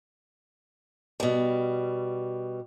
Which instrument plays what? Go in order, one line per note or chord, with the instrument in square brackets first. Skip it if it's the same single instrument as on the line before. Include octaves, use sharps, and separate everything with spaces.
[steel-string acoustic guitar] B2 G3